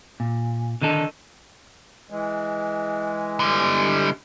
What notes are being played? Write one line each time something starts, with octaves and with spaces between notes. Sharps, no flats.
A#2
D3 D#3 D#4 A4
E3 G#3
D3 G3